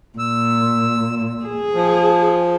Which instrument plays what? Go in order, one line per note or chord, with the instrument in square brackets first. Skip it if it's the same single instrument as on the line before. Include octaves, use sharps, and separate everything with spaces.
[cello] A#2 [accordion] E6
[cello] G#4
[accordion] F3